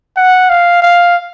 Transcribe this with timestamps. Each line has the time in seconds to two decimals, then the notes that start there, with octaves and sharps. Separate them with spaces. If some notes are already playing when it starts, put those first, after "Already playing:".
0.17 F#5
0.50 F5
0.82 F5